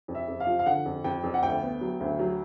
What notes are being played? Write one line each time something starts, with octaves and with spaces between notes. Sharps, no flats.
F2
E5
F2
F5
F3
F5
D3 F#5
F2
F2 G5
F2
F#5
D2 G5
B3
F#3
D2
F#3